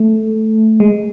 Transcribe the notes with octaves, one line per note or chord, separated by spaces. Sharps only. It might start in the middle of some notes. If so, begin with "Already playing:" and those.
Already playing: A3
G#3